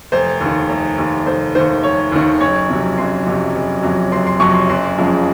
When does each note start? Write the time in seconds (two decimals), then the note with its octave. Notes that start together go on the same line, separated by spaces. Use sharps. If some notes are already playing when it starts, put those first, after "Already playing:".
0.12 F1 C5
0.40 D#2
0.46 D#3
0.69 F1
0.98 D#2 D#3
1.26 F1 C5
1.55 D#2 D#3 C5
1.83 F1 C#5
2.12 D#2 D#3
2.40 F#1 C#5
2.69 F2 C3 F#3
2.98 F#1 C6
3.26 F2 C3 F#3
3.55 F#1
3.83 F2 C3 F#3
4.11 F#1 C6
4.27 C6
4.40 F2 C3 F#3 C#6
4.54 C6
4.69 F#1 C6
4.97 F2 C#3 F3 G#3